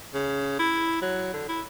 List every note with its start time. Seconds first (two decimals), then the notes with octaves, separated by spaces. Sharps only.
0.14 C#3
0.59 E4
1.02 F#3
1.33 D3
1.49 E4